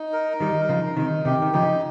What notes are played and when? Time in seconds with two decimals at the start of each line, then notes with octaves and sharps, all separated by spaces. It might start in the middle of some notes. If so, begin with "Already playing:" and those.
Already playing: D#4
0.13 A#4
0.40 D#3 G3 D#4
0.69 C#3 F3 A#4
0.97 C3 D#3 D#4
1.25 C3 D#3 G4
1.42 D#3
1.53 C#3 F3 D#4